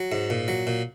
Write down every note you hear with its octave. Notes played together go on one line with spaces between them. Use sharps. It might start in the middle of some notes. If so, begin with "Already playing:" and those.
Already playing: F#3
G#2
A#2
F#3
A#2